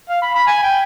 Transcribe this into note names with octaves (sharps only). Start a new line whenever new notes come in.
F5
B5
B5
G#5
G5